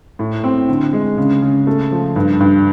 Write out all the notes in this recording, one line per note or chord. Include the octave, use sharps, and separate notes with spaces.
A2
C4
D3
G#3
C#3
C#3
A3
F3
G2
G2